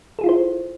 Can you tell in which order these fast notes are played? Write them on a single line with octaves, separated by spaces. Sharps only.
A4 G#4 F4 E4 C5